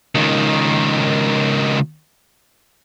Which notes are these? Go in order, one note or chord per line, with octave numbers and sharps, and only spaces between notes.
C#2 D#3